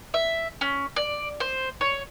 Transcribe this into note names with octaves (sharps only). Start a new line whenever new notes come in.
E5
C#4
D5
C5
C#5